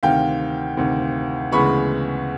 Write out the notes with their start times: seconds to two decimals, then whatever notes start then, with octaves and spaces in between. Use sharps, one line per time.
0.03 D2 C3 D#3 F5 G5
0.77 D2 C3 D#3
1.51 D2 C#3 E3 G#3 B3 B5 C#6